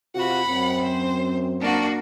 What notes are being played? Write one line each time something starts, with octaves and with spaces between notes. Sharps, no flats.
C3 F4 F#4 F#5 B5
F#2 C4
C5
A#3 D4 F#4